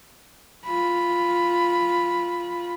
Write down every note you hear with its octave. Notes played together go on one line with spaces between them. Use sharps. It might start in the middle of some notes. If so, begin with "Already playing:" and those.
F4 B5